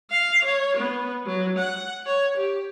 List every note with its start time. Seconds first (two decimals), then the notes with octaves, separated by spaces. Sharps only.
0.10 F5
0.45 C#5
0.77 B3
1.26 F#3
1.59 F#5
2.06 C#5
2.38 G4